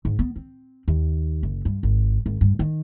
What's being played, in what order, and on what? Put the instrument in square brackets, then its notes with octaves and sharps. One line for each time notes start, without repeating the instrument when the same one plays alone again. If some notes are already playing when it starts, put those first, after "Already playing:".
[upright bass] G#2
B3
C4
D#2
F#1
G2
G#1
G#1
G2
D#3